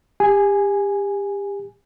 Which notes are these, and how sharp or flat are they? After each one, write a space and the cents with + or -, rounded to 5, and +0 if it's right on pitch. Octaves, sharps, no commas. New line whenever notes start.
G4 +30 G#5 +0